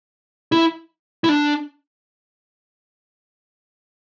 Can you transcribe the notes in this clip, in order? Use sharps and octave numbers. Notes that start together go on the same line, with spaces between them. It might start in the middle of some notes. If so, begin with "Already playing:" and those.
E4
E4
D4